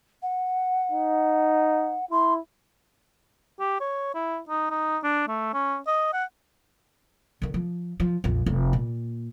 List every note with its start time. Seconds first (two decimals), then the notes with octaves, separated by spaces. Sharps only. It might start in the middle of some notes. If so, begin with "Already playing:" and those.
0.22 F#5
0.92 D#4
2.11 E4 C6
3.60 G4
3.80 C#5
4.14 E4
4.49 D#4
4.70 D#4
5.04 D4
5.28 A3
5.54 C#4
5.87 D#5
6.13 F#5
7.42 D3 D#3
7.54 F3
8.00 F3
8.24 A#1 F2
8.46 F1 F2
8.73 A#2